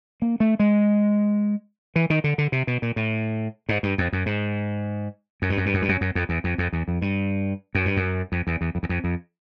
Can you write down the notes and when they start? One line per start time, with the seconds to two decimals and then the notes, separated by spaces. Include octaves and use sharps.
0.22 A#3
0.40 A3
0.59 G#3
1.96 E3
2.10 D#3
2.24 D3
2.38 D3
2.52 C3
2.67 B2
2.82 A#2
2.96 A2
3.69 G#2
3.83 G2
3.98 F2
4.13 F#2
4.26 G#2
5.42 F#2
5.50 G2
5.57 F#2
5.66 G2
5.74 F#2
5.82 G2
5.89 F#2
6.01 F#2
6.15 F2
6.29 E2
6.44 F2
6.58 F2
6.73 E2
6.88 F2
7.02 G2
7.75 F#2
7.85 G2
7.97 F#2
8.32 F2
8.47 E2
8.61 E2
8.75 F2
8.83 E2
8.89 F2
9.04 F2